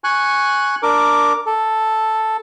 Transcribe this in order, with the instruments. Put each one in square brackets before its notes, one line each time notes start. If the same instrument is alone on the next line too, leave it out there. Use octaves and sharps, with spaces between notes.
[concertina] G#5 C#6 F#6
D4 A#4 D6
A4